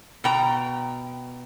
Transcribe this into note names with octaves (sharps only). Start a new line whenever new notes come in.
B2 G5 A#5